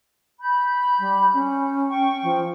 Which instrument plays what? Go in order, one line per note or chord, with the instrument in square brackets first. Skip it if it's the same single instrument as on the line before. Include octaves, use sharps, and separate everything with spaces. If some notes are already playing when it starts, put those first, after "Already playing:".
[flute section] B5 G6
[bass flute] G3
C#4
[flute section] G5 C#6
[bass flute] F3